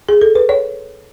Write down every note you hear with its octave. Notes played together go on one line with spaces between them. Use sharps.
G#4
A4
B4
C#5